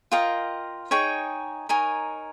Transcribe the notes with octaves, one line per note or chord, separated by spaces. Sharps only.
F4 A#4 D#5 G5
D#4 G#4 C#5 G5
D#4 A#4 C#5 G#5